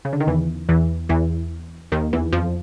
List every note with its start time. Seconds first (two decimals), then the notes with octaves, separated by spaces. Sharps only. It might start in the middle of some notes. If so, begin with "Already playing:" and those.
0.05 C#3
0.13 D3
0.20 D#3
0.27 E2 E3
0.69 E2 E3
1.09 E2 E3
1.92 D#2 D#3
2.13 E2 E3
2.32 F2 F3